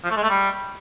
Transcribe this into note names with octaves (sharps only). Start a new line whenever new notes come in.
F3
A3
G#3
A3
G3